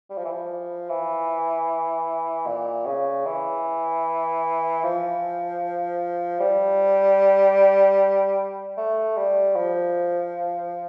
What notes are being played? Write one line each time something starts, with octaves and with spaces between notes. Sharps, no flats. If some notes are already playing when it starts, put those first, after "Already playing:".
G3
F3
E3
F3
E3
A#2
C#3
E3
F3
G3
A3
G3
F3